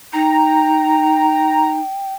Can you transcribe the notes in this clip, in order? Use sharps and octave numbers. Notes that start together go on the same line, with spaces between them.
D#4 G5 A#5